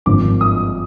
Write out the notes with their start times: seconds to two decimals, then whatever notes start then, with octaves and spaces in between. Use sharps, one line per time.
0.06 G#1 G2 F3 A#3 D6
0.41 D#6